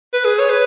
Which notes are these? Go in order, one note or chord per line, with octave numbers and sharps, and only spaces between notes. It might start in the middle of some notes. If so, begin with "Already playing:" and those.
B4
G#4
C#5
B4